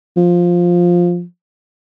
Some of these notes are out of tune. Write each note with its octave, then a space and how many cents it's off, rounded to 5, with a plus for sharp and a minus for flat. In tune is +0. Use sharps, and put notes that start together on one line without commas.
F3 +5